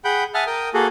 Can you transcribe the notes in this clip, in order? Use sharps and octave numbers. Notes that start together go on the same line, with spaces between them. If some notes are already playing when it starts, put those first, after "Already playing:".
G#4 F#5 G5 B5 G6
E5 F#5 G#5 A5 D#6 F6
A#4 G5 D#6
A#3 F#4 G#4 A4